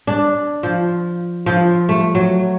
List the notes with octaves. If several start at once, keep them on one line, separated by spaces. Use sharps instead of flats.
D4
F3
F3
A3
F#3